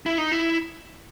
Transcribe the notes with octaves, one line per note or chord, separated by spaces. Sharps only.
E4
D#4
E4